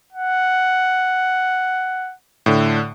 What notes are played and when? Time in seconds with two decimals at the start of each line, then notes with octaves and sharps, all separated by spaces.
0.13 F#5
2.46 A2 D3